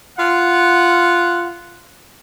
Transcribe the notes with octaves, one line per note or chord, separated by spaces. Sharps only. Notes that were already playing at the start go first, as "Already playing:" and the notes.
F4 F#5